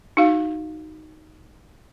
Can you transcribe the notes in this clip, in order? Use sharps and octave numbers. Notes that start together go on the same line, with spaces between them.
D#4 F#4 F5